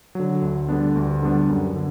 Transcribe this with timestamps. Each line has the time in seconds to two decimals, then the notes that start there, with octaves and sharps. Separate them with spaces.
0.15 D3 F#3
0.42 D2
0.69 D3 G3 B3 D4
0.95 D2
1.22 D3 G3 B3 D4
1.49 F#2
1.76 D3